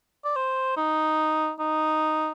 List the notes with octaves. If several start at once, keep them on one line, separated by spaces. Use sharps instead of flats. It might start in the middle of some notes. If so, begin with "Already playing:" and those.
D5
C5
D#4
D#4